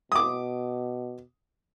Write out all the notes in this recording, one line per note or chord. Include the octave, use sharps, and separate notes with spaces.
B2 D6 D#6